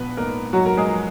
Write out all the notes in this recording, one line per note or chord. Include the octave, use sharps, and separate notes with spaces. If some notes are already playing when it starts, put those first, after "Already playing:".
Already playing: A#1 B3 B4
G#2 A#3 A#4
G#2 F#3 F#4
A#4
G#3 G#4
F3